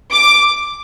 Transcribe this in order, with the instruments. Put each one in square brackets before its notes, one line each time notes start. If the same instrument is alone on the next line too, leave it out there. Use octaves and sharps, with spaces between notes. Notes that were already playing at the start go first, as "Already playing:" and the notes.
[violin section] D6